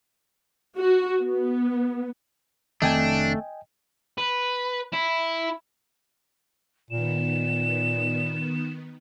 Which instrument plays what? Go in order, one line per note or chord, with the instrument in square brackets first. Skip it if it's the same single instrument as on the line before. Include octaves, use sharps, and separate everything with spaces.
[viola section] F#4
B3
[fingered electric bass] F1 D#3 C4 [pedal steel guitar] A3 [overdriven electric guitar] D4 [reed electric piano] D#5 G5 G#5
[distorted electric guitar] B4
E4
[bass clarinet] A#2 [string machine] D#3 B3 [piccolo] E7